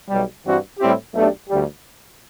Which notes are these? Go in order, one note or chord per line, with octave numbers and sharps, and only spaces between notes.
B1 B2 G3
G2 E3 G3 C4 F#4
A2 G3 C4 E4 G4
B1 B2 A3 D4 G4
D2 D3 G3